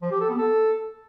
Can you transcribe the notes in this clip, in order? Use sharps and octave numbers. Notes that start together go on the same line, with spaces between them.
F3
G4
A4
B3
A4